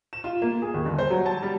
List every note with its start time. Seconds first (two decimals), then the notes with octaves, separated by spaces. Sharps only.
0.13 E7
0.24 F4
0.42 A#3
0.62 G#4
0.74 D#2
0.85 G1
0.99 C5
1.10 F#3
1.26 A5
1.42 G3